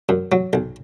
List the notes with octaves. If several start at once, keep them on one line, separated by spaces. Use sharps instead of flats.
F#2
F#3
B1